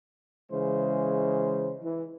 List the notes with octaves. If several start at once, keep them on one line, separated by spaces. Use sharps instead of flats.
C#3 E3 G#3 C5
E3